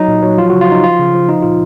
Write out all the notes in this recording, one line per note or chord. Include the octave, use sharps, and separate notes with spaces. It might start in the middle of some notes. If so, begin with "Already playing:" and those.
Already playing: F#3 D#4
A#2
F#3
F3 F4
F#4
C#3
F4
F3 D#4
F3 F4
C#3
F3
F3 D#4
A#2 F4